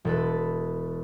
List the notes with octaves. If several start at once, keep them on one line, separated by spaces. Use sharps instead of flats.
E1 A4 B4